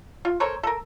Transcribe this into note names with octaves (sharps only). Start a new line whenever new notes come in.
F4
A4 A#4 C5 C#5
A4 A#4